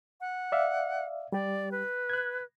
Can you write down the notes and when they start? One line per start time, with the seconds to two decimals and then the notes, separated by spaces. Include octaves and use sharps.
0.21 F#5
0.52 D5 E5 F5
1.32 G3 G4 D5
1.72 B4
2.10 F#6 G#6